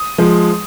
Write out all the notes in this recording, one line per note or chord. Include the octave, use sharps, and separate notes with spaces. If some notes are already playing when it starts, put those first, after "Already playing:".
Already playing: D#6
F3 G#3